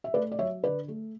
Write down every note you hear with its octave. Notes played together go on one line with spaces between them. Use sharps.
E5
A3 B4 D5
D5
F#3 C#5 E5
D3 B4 D5
A3